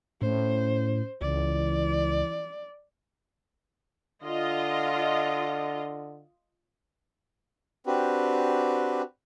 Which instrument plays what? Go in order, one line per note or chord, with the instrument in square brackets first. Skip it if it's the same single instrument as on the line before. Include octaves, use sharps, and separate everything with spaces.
[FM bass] A2 [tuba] C#4 [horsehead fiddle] C5
[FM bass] C#2 [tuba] E3 [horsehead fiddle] D5
[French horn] D3 [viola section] F4 D#5
[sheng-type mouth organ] C4 D4 F#4 G4 B4